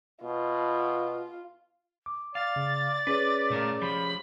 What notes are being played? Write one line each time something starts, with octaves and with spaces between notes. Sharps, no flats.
B2 F4
D6
D5 F5 A6
C#3
C#4 G#4 B4 C#5
A#2 A3 A#4
F3 G4 B5